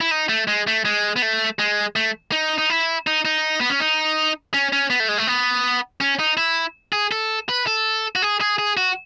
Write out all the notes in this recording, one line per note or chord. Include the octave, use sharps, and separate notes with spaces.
E4
D#4
A3
G#3
A3
G#3
B3
A3
G#3
A3
D#4
D#4
E4
D#4
D#4
B3
C#4
D#4
C#4
C#4
B3
A3
G#3
A3
B3
C#4
D#4
E4
G#4
A4
B4
A4
F#4
G#4
G#4
G#4
F#4